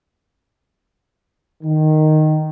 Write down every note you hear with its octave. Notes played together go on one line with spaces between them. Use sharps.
D#3